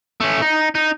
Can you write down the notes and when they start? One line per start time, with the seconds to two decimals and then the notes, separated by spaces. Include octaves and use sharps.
0.20 A3 C#4
0.42 D#4
0.75 D#4